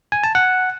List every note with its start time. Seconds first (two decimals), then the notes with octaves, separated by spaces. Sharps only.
0.12 G#5
0.24 A5
0.35 F#5